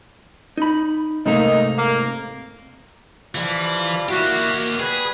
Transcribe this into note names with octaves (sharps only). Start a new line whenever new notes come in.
D#4 B5
G#2 C3 A3 A#3 D#4
A#3
E3 F3 G3 F4
A#3 E4 F#4 G4
G3 G#4 B4